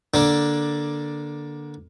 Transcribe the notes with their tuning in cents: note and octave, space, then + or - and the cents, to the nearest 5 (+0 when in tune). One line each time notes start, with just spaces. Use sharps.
D3 +0 A#3 +20 D4 +0